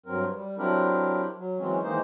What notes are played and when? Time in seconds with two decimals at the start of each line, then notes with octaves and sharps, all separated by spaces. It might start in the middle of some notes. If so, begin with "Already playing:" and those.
0.06 G2 F#3 C4 A#4
0.33 G3
0.58 F#3 C4 D4 E4 G4 A#4
1.37 F#3
1.59 E3 F#3 G#3 C4 C#4
1.83 D#3 E3 G#3 A#3 D#4 C5